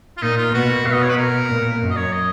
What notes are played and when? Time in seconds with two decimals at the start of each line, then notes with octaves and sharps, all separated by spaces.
0.17 F4
0.22 A#2 D#4
0.37 F4
0.53 B2 F#4
0.86 B2 F5
0.93 D#5
1.02 C#5
1.09 B4
1.17 A#4
1.49 A#2
1.80 F#2
1.90 D#5
1.96 C#5
2.12 D#5